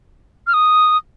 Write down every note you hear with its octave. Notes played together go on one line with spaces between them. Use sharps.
F6
D#6